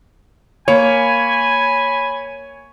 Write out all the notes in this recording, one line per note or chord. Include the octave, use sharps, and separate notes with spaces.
A#3 C#5 G#5 B5